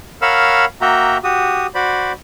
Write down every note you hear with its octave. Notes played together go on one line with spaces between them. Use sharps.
A#4 C#5 F5 F#5 B5 E6
A#3 F#4 E5 G5 A#5
F#4 G4 D#6
F#4 C5 D5 B5